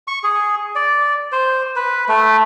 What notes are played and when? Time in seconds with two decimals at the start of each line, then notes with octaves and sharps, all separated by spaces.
0.08 C#6
0.23 G#4
0.75 D5
1.32 C5
1.76 B4
2.09 A3